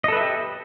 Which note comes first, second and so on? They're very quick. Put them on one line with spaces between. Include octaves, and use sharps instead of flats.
D#5 A4 B4 E5 G4